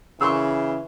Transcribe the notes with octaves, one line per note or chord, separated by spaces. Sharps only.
C#3 E3 C6 C#6 E6